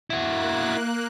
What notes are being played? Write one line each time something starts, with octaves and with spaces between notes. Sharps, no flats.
A#3 E4 F#4 F#6